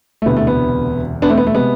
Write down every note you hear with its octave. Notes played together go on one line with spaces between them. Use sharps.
A3
E1 D2 C3 E3 B3
A3
B3
B3 D4
A3 C4
B3
A3
C3 G#3 B3